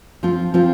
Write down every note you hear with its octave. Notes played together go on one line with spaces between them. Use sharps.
F3 C4 F4
F3 C4 F4